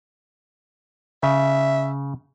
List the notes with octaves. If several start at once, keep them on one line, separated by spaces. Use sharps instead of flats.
C#3 E5